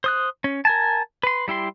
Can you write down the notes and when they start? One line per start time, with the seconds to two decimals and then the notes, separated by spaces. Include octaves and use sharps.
0.04 C5 D#6 F#6
0.44 C#4
0.65 A#4 G#5 A5
1.23 B4 C6
1.48 G3 E4 G4 C6